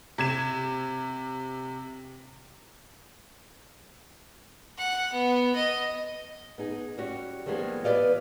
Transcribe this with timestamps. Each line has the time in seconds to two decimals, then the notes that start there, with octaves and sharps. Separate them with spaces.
0.18 C3 G#6 E7
4.78 F#5
5.13 B3
5.55 D#5
6.58 B3 D#4 G#4
6.98 G3 C#4 F#4
7.46 D#3 F3 G3 G#3 A#3 B3
7.84 E3 B3 B4 D5 D#5 F5